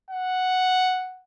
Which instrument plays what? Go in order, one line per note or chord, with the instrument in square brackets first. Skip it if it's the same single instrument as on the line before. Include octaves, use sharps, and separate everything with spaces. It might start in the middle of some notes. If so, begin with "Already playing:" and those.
[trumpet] F#5